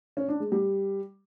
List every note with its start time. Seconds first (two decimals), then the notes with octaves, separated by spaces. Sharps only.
0.17 C#4
0.28 D4
0.40 G#3
0.52 G3